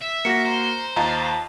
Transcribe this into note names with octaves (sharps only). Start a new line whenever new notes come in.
E5
A#3 F#4 A#6 C#7
C5 A#5
D#2 F4 D#5 A5 A#5